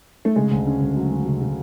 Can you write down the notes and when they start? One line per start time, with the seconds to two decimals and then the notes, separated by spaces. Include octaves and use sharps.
0.25 A3
0.36 C#3 G#3
0.51 D2
0.66 C#4
0.81 D2
0.97 F#3
1.12 C#4
1.26 C#3
1.41 C#3